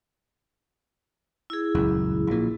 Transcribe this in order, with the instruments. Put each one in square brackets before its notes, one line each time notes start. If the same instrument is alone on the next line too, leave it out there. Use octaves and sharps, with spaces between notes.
[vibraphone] E4 G#4
[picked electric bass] D#1 C#2 F#2
A#1 A#2